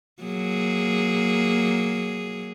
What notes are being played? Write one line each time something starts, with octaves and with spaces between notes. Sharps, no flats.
F#3 A#3 G#4